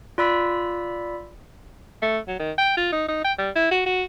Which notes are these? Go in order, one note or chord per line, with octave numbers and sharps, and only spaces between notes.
F4 D5 B5 E6 B6
A3
F#3
D#3
G5
F4
D#4
D#4
G5
G3
E4
F#4
F#4